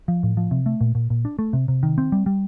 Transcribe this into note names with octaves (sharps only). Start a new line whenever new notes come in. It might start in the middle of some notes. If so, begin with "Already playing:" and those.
F3
A2
F3
C3
A3
A#2
A#2
A#2
D4
A3
C3
C3
D#3
C4
G3
G3